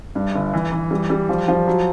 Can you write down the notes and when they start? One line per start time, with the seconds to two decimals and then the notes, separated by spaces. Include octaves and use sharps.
0.15 G2
0.35 G1
0.54 E3
0.72 E3
0.91 G3
1.10 G3
1.29 F3
1.48 F3
1.67 F#3